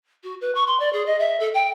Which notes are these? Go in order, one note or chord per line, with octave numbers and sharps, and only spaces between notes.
F#4
B4
C#6
C6
D5
G#4
D#5
E5
A4
G5